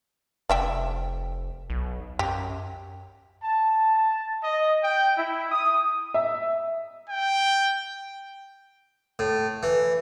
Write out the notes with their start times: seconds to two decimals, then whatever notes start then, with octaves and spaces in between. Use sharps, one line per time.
0.49 F1 D5 E5 G5
1.70 B1
2.19 F#2 G4
3.43 A5
3.96 A5
4.43 D#5
4.84 G5
5.17 E4
5.51 D#6
6.14 E5
7.09 G5
9.19 A2
9.63 E3